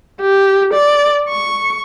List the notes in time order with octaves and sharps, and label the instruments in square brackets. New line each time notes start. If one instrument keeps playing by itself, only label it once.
[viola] G4
D5
C#6